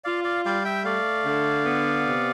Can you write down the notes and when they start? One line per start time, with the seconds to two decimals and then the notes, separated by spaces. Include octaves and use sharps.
0.04 F4 D5 F5
0.24 D5 F5
0.45 G3 D5 F5
0.65 E5 G5
0.84 A3 D5 F5
1.24 D3
1.65 B3
2.05 C3